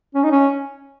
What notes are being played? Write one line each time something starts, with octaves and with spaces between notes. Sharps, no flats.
C#4
D#4
C#4